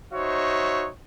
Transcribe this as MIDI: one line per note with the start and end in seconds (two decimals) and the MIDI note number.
0.14 0.89 63
0.14 0.89 66
0.14 0.89 72
0.14 0.89 73
0.14 0.89 76